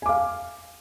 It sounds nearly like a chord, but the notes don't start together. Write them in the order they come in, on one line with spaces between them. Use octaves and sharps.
G#5 D6 F5